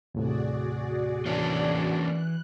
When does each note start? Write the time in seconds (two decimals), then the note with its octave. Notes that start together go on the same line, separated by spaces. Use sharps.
0.15 D#2 A2 C3 F#4 G#4 D5
1.26 E3 A#3 C#4 D4
2.02 F#6